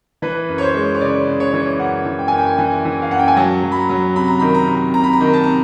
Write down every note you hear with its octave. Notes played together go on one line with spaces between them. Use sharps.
E3 B4
F#2
C#5
C5
G#3
C#5
C#3 D5
C#3
C#5
E3
F#2 F#5
E3
G5
F#2 G#5
G5
E3 G#5
E3
F5
F#2 F#5
G5
G#5
F#3 A5
F#3
B5
A#5
F#3
C3 B5
A#5
D#3 B5
A#5
C3
C3 A#5
B5
A#5
D#3
A5
C3 A#5